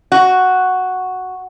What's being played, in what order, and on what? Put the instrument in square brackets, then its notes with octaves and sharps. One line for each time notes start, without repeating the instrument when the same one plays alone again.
[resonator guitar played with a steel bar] F#4